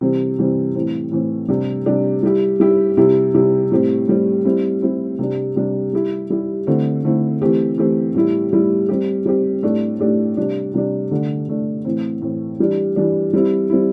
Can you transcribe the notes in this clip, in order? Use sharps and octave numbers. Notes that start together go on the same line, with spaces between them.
C3 E3 G3 C4
C3 E3 G3 C4
A2 E3 C4
A2 E3 C4
C3 G3 D4 G4
C3 G3 D4 G4
G3 E4 G4
G3 E4 G4
C3 G3 E4 G4
C3 G3 E4 G4
A2 G3 C4 G4
A2 G3 C4 G4
G3 C4 E4
G3 C4 E4
C3 G3 D4
C3 G3 D4
G3 E4 G4
G3 E4 G4
D3 A3 C4 E4
D3 A3 C4 E4
E3 A3 C4 G4
E3 A3 C4 G4
A2 G3 E4
A2 G3 E4
G3 C4 G4
G3 C4 G4
A2 A3 D4 G4
A2 A3 D4 G4
C3 G3 D4
C3 G3 D4
D3 A3 D4
D3 A3 D4
A2 E3 C4
A2 E3 C4
E3 G3 D4
E3 G3 D4
G3 C4 E4
G3 C4 E4